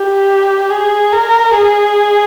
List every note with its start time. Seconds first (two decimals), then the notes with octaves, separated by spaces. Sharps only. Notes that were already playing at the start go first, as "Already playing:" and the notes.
Already playing: G4
0.70 G#4
1.12 A#4
1.56 G#4